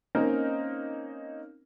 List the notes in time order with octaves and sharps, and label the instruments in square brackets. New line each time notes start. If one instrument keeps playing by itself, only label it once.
[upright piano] A#3 C4 C#4 D#4 A#4